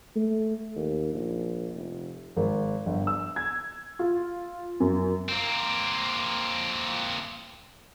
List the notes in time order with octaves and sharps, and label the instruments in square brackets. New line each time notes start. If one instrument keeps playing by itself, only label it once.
[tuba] A3
D#2
A#1
F1
[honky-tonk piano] G#1
G1
E6
G#6
F4
F#2
[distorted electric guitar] A#3 C4